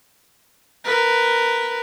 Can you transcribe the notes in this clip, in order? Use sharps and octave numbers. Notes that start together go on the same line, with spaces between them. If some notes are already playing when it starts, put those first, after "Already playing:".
A#4 B4